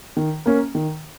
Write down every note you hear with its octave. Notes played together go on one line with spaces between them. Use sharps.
D#3
A#3 C#4
D#3